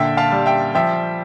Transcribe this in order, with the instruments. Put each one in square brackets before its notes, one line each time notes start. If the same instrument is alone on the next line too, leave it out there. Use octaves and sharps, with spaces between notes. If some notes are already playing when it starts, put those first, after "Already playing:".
Already playing: [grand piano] A#2 D3 E5 G5
F5 A5
G3
E5 G5
F3 E5 G5